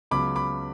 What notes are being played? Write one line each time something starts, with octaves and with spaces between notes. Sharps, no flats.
C#2 C#3 F#3 B3 B5 D6
B5 D6